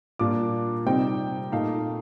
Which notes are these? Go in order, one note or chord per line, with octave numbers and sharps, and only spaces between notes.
A#2 G3 A#3 D4 F4 D6
C3 G3 C4 D#4 G5
A#2 A3 D#4 F5